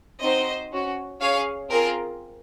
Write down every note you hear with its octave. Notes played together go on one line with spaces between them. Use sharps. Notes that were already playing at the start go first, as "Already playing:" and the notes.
C4 D#4 F#4 C5 D#5
C#4 F#4
C#4 G#4 C#5 F5
C4 F4 G#4 A#4